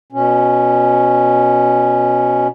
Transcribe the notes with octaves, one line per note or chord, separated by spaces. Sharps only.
B2 C#4